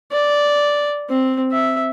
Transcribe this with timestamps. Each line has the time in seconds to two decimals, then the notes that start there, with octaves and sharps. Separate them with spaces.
0.12 D5
1.09 C4
1.52 E5